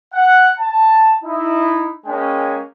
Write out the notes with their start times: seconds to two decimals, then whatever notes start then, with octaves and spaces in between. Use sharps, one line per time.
0.13 F#5
0.60 A5
1.24 D#4 E4
2.06 G#3 A#3 C#4 G5 G#5